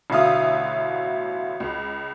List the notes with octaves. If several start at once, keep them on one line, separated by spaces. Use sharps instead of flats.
A1 B2 D3 E5 F5 D#6
C#2